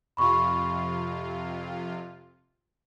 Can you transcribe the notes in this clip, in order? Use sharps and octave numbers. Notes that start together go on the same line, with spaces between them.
F2 C3 F4 B5 C#6